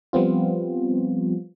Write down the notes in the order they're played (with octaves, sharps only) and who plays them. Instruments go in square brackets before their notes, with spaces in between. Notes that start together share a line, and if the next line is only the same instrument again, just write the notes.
[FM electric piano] F3 G3 B3 C4 F4